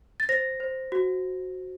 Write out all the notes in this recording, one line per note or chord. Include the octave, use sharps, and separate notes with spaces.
A6
C5 A#6
C5
F#4